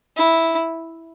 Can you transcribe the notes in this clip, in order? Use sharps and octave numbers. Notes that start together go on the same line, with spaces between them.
E4